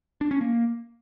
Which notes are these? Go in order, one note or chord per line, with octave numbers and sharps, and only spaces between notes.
D4
C#4
A#3